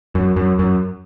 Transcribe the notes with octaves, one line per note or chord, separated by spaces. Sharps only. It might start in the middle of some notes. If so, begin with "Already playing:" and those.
F#2
F#2
F#2